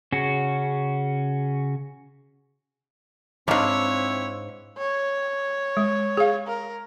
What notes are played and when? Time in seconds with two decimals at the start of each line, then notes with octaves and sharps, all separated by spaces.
0.12 C#3 C#4 F#4
3.48 E2 G#2 C4 D4 E4 C#5 F5
4.78 C#5
5.77 G#3
6.17 G#4 F5
6.47 A#4